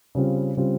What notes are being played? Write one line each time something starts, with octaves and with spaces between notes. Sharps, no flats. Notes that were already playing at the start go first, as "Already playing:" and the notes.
C#3 G3 C4 F4
C#3 G3 C4 F4